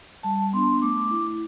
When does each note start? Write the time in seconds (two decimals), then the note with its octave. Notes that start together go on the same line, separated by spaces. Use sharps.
0.23 G3 A5
0.53 B3 D4 C6
0.82 A3 D6
1.11 E4